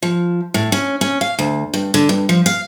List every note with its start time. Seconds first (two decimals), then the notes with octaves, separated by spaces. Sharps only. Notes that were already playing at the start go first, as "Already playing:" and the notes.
0.03 F3
0.54 A2
0.72 C#4
1.01 C#4
1.21 F5
1.39 D2
1.74 G2
1.94 D3
2.09 G2
2.29 F3
2.46 F5